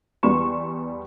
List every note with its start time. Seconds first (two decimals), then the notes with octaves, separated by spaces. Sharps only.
0.23 E2 G3 B3 C6 C#6 E7